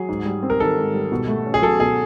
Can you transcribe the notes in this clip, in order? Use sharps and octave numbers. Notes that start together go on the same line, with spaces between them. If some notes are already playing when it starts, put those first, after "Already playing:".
Already playing: F#3 G#4
G#2
G3
C4
A#4
D#3 A4
G#2
G3
B2
A3
C#4
G#4
F#3 A4
B2 G#4